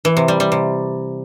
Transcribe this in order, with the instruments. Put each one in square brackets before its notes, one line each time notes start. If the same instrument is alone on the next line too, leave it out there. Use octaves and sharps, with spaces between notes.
[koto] E3
C3
G3
G3
C3